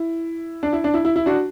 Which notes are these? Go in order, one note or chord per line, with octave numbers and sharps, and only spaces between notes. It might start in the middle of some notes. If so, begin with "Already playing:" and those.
Already playing: E4
D4
E4
D4
E4
E4
E4
D4 F#4